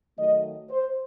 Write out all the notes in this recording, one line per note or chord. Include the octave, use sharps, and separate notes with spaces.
D#3 F#3 A3 D#5
C5